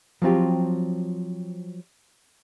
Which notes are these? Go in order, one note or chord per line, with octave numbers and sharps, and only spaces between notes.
F3 F#3 C4 F4 G4